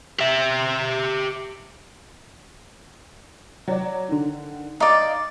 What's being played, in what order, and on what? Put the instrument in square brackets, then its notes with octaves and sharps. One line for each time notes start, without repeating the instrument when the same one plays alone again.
[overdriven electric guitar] G4 E5
[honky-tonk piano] F#3 D5
D3 D#3
[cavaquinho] D#4 D5 [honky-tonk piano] F5